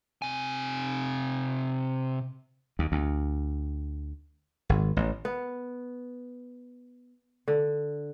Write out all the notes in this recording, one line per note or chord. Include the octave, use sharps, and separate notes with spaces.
C3 G#5
D#2
D2
G#1
A1
B3
D3